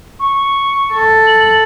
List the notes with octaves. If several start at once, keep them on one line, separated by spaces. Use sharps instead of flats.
C#6
A4
F#7